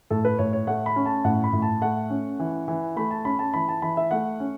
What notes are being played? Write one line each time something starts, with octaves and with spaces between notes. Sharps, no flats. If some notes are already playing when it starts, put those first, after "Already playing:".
A2 A4
B4
A2 C#5
C#5
A3 F#5
B5
C#4
A5
A2 F#5
B5
A2
A5
A3 F#5
C#4
E3
E3
A3 B5
A5
C#4 B5
A5
E3 B5
A5
E3 B5
E5
A3 F#5
C#4